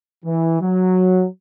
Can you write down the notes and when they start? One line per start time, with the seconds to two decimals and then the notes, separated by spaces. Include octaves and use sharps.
0.25 E3
0.61 F#3